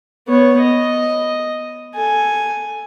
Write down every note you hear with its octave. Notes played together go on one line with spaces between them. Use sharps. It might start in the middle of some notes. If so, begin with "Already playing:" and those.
B3 C#5
D#5
A4 G#5